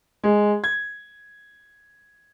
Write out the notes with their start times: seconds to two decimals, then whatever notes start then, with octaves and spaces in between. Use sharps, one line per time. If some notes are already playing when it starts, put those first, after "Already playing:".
0.24 G#3
0.64 G#6